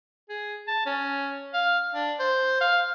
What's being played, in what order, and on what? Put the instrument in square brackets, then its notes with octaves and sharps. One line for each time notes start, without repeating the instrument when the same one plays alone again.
[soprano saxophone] G#4
A5
C#4
F5
D4
C5
F5